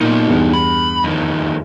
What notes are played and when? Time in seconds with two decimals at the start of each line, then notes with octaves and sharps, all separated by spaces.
0.01 A#2 B3 D#4
0.28 E2 G2
0.53 B5
1.04 F2 D#3